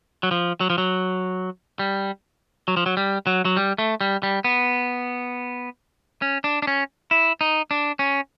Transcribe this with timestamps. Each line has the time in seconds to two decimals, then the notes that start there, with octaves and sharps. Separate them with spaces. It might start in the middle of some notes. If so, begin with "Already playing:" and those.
0.23 F#3
0.31 F3
0.61 F#3
0.70 F3
0.78 F#3
1.79 G3
2.68 F#3
2.77 F3
2.86 F#3
2.97 G3
3.27 F#3
3.45 F#3
3.57 G3
3.78 A3
4.01 G3
4.23 G3
4.44 B3
6.22 C#4
6.44 D4
6.62 D4
6.67 C#4
7.11 E4
7.41 D#4
7.71 D4
7.99 C#4